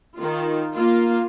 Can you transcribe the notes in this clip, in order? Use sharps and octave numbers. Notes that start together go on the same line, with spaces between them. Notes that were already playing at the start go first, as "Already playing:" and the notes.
D#3 F4
A#3 F4